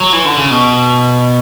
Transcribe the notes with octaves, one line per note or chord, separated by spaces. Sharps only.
F#3
E3
D3
C#3
B2